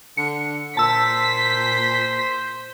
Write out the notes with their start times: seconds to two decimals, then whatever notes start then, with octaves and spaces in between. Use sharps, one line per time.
0.17 D3 C#7
0.77 A#2 C5 A5 E6 B6